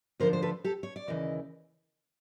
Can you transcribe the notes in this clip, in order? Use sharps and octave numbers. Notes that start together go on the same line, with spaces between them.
D2 D3 F3 A#4 C5
C5
A4 B4
G4 A4
C#5
D5
D#2 C#3 E3 D#5